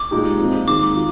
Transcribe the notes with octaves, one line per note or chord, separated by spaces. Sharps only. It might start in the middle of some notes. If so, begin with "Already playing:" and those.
Already playing: D6
A#2 G#3 D#4 G4
A#2 F3 C4
D#3 G#3 D#4 D6
F4